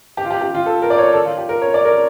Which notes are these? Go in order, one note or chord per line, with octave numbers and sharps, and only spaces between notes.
G4
F4
G4
G4
F4
A4
A#4
D5
C#5
A4
F4
G4
A#4
C#5
D5
A#4